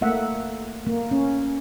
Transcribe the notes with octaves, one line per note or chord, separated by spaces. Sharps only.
A3 A#3 E5 F#5
A#3
C#4